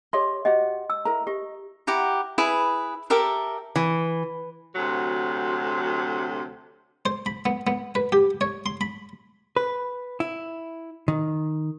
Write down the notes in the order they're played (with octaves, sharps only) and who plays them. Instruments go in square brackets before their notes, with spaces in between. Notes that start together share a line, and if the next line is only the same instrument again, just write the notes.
[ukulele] G4 C#5 D#5 [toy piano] C6
[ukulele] F#4 G4 F#5 [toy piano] D#5
[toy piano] E6
[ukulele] E4 A#4 A#5
[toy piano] G4 [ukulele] D#5
[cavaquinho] E4 G4 F#5 A#5
E4 G#4 B4
G4 A4 A#4 E5
[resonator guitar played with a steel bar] E3
[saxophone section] D2 C3 F#3
[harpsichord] C5
B5
B3
B3
B4
G4
C#5
C6
B5
[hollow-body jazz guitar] B4
E4
D#3